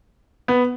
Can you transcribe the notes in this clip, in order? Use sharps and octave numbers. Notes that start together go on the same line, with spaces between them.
B3